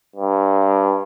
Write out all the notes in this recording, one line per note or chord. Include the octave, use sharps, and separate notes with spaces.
G2